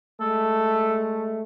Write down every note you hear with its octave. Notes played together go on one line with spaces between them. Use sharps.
G#3 A3 A4